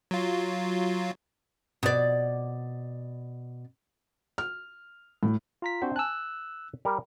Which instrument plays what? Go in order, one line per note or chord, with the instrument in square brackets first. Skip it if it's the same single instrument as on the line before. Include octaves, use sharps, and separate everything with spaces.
[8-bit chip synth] F#3 F4
[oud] B2 D5
[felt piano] F6
A2
[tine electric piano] F4 A#5 B6
[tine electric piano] C4 D4 C5 [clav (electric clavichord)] F#4
[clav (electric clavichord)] G#5 A5 [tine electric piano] E6 F#6
[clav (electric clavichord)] G3 A#4